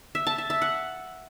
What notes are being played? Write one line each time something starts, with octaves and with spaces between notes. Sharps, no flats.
E5
A5
E5
E5
F#5